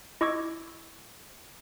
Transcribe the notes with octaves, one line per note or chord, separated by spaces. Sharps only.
E4 D#5 C#6 D6 E6 G#6